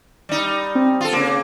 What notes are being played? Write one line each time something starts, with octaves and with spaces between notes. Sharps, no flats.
G3 D#4
C4
F4 A4
C#3 A#3